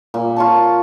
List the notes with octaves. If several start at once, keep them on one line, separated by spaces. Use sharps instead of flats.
A#2
F4 C#5 A5